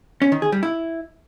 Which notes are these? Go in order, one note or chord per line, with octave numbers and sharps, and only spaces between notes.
C#4
D#3
G#4
G3
E4